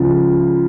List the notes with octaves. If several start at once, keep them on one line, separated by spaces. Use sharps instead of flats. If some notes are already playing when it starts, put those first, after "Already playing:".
Already playing: C#2 C#3 F3